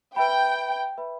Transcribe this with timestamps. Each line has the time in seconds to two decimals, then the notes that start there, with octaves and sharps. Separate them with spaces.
0.16 B4 E5 G5 B5
0.98 B4 E5 B5